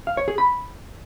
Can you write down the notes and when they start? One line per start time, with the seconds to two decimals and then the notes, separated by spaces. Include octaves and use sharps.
0.07 F5
0.17 C#5
0.28 G#4
0.38 B5